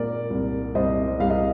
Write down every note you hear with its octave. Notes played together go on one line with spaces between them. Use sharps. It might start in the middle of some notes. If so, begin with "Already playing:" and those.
Already playing: A#2 G#3 A#4 D5
C2
C2 C5 D#5
C2 F5
D#5